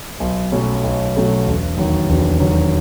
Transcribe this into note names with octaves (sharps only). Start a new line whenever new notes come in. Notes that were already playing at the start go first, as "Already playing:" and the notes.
B1
B2 F#3 A3 C#4
B1
B2 F#3 A3 C#4
E1
D#2 D#3 F#3
E1
D#2 D#3 F#3